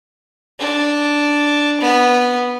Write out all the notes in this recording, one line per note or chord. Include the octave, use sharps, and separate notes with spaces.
D4
B3